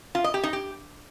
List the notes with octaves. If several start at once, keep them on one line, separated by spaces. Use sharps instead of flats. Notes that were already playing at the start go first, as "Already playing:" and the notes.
F4
D#5
G4
D#4
G4